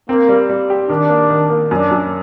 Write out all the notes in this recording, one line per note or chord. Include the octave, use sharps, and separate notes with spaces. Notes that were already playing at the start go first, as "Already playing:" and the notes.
A#3 C4
G3
G3
G4
D#3 D4
A#3
D#3
A#3
F#2 D4
F#2